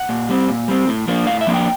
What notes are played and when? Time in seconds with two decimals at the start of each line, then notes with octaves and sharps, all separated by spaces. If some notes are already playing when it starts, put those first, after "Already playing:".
Already playing: F#5
0.09 A#2
0.29 G3 C4
0.49 A#2
0.68 G3 C4
0.87 A2
1.07 F3 A#3 D4
1.27 A2 F5
1.41 E5
1.47 F3 A#3 D4
1.54 G5